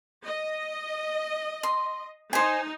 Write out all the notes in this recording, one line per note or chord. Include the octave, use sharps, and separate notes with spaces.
D#5
C6
D#4 C5 G#5